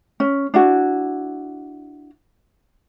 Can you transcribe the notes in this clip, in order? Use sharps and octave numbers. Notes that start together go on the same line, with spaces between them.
C#4
D4 E4 F#4